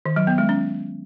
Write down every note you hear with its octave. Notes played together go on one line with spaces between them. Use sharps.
D#3
F#3
B3
G#3
C#4